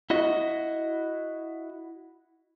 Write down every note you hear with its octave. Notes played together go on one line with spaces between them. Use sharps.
E4 F#4 D#5